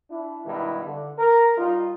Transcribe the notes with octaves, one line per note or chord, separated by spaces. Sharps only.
D4 E4
G2 B2 D#3 G#3 E4
D3
A#4
G3 D#4 F4